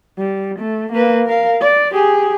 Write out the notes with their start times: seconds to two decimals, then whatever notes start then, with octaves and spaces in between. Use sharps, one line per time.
0.18 G3
0.59 A3
0.93 A#3 B4
1.26 A#4 F5
1.61 D5
1.93 G4 G#4